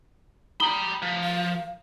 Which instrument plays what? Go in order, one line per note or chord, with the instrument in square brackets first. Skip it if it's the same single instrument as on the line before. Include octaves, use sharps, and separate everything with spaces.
[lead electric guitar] G5 B5 [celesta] A#5 D#6 G7
[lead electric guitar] F3
[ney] F5